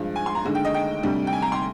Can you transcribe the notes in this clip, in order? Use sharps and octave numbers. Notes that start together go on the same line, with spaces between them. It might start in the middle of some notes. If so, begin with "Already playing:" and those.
Already playing: G2 F3 G#3
G#5
C6
A#5
D#2 D3 G#3
G5
D#5
G5
D2 C3 G3
G5
G#5
A#5
C6